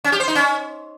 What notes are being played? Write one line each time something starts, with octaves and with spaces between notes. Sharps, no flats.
C#4
G4
C5
D#4
C#4